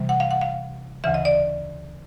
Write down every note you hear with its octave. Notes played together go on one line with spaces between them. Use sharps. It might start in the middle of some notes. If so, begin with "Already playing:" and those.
Already playing: C3 E3 G3
F#5
F5
F#5
F5
D2 C#3 E3 E5
D#5
D5